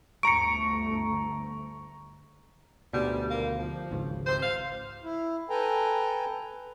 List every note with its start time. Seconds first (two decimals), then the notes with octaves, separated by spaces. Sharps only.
0.23 G1 D2 A3 A#5 C#6 C#7 D7
2.93 D2 G#2 B2 G3
3.30 D#2 G3 A#3
3.58 F3
3.91 G#1 C#2
4.26 C3 C5
4.42 F5
5.03 E4
5.50 A4 B4 G5 G#5 A#5